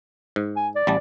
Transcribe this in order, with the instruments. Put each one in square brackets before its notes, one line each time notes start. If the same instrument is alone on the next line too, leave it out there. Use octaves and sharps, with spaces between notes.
[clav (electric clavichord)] G#2
[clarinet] G#5
D5
[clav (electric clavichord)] A1 G3 A5